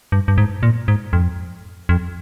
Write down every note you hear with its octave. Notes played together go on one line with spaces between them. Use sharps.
G2
G2
G#2
A#2
G#2
F2
F2